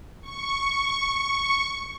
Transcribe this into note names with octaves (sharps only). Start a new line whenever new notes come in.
C#6